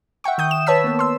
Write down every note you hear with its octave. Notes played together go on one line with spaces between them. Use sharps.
E5 F#5 G5 C#6
D#3 D#6 G6
E7
B4 C#5 A5 E6 B6
A#3 B3
C6 E6